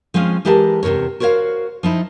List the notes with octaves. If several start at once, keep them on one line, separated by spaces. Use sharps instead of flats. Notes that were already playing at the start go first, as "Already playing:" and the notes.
F3 G#3 C4 C#4 F5
E3 G#3 G4 A#4 G5 A5
E2 C3 D#3 A#4 C#5
F#4 A#4 C5 C#5 F5
F3 D#4 E4